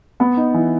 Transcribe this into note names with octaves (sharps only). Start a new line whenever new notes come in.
B3
D#4
E3